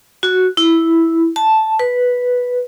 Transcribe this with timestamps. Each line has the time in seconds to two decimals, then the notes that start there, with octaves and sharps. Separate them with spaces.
0.23 F#4
0.57 E4
1.36 A5
1.79 B4